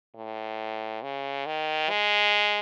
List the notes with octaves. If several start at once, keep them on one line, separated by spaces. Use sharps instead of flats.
A2
C#3
D#3
G#3